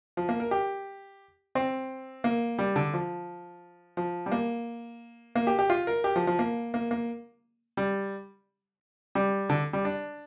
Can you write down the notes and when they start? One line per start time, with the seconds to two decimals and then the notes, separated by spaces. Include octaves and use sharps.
0.17 F3
0.29 A#3
0.40 A#4
0.51 G4
1.55 C4
2.24 A#3
2.59 G3
2.76 D3
2.93 F3
3.97 F3
4.26 G3
4.32 A#3
5.35 A#3
5.47 G4
5.59 G4
5.70 F4
5.87 A#4
6.04 G4
6.16 F3
6.27 F3
6.39 A#3
6.74 A#3
6.91 A#3
7.77 G3
9.15 G3
9.50 D3
9.73 G3
9.85 D4